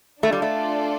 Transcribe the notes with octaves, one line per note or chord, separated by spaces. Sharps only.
A3 D4 F4 A4 D5
G3
A3